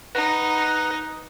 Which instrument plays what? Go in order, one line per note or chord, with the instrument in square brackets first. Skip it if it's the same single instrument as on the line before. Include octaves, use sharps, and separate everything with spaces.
[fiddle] D#4 [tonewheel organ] B4 F#5 A#5